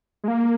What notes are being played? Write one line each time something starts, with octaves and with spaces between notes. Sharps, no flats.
G#3
A#3